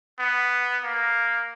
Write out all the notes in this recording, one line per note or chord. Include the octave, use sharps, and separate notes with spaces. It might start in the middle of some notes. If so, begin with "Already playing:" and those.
B3
A#3